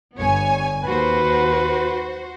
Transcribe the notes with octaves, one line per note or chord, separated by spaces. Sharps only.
G1 B3 C#5 G#5
D#2 F#4 B4 C5